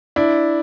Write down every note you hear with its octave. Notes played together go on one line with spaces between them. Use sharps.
D4 E4